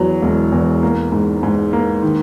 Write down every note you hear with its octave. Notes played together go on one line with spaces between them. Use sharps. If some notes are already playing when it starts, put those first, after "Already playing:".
Already playing: E2 F#3
E1
E2
A#3
G#2
G#2
A#3
D#3